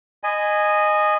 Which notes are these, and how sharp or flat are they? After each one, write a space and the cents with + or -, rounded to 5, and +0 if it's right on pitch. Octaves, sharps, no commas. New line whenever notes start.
D#5 -15 G#5 +0 B5 +30